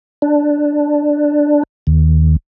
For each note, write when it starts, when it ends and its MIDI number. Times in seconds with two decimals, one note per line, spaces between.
0.22 1.63 62
1.87 2.36 39